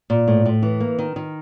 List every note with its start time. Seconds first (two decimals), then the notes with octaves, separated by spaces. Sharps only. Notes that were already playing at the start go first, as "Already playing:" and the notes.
0.10 A#2
0.28 A2
0.46 A2
0.62 E3
0.80 A#3
0.99 D#3
1.16 D#3